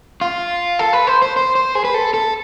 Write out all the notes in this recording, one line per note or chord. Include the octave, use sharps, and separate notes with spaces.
F4
A4
B4
C5
C5
C5
C5
G#4
B4
A4
A4